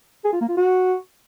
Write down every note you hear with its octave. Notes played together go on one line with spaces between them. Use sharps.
G#4
F4
A#3
F4
F#4